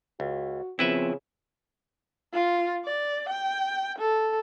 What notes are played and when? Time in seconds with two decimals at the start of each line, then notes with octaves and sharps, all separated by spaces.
0.20 C#2 F#4
0.79 C#3 F3 B3 C4 E4 B4 E5
2.33 F4
2.85 D5
3.29 G5
3.99 A4